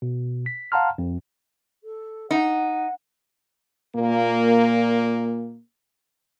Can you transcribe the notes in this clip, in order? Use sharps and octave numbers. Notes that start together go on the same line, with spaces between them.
B2
B6
F5 F#5 A5 A#5 C6 F6
F2
A4
D#4 F#5
A#2 A#3